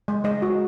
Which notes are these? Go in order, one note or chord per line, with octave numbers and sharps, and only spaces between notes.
G#3
G#3 D#5
F#4